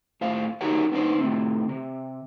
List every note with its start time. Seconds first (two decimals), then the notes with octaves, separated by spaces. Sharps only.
0.21 A2 C5 F5
0.61 D#4 F#4 G4 A#4 C#5 F#5
0.92 B3 D4 D#4 C5
1.18 A2 C3 C4
1.69 C3